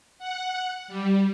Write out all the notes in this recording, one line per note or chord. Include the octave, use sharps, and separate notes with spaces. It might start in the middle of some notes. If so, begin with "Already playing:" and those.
F#5
G3